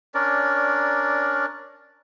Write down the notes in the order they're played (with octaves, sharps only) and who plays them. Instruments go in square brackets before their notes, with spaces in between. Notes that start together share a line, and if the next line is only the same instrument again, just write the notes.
[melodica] C#4 D4 A#4 D5